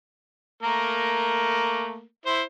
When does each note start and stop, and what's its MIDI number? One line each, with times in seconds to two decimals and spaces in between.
0.63 2.04 57
0.63 2.04 58
0.63 2.04 70
2.26 2.42 64
2.26 2.42 72